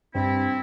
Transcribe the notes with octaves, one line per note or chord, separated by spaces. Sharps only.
G2 C4 E4